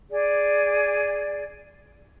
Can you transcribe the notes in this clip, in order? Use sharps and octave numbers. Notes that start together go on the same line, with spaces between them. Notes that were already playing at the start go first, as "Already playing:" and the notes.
G#4 D5